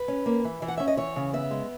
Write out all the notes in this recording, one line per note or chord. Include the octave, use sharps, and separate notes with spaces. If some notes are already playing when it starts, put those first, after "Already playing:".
Already playing: B4
C#4
A#3
E3
E3
F#5
C#4 E5
D#5
E3 C#5
C#3
B3 E5
G#3